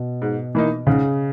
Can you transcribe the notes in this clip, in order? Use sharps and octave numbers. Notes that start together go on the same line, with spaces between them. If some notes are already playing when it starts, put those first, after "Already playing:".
Already playing: B2
G#2
E3 A#3 D#4
G#2 C#3